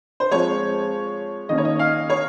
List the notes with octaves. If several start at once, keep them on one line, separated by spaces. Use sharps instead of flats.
C5
F3 G#3 C4 C#5
D#3 A#3 C#4 D#5
C#5
D#5
F5
C#5